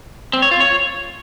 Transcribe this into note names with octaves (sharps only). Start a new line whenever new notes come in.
C4
C#5
F4
C#5